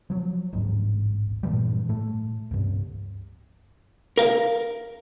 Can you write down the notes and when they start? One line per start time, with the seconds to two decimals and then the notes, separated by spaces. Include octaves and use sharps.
0.10 F3 F#3
0.53 D1 A1 G#2
1.43 G2 A#2 E3 G3
1.89 A2 A3
2.51 C#2 G2
4.17 A#4 F5